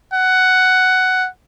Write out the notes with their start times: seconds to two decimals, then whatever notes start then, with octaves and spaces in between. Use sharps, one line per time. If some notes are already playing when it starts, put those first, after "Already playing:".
0.13 F#5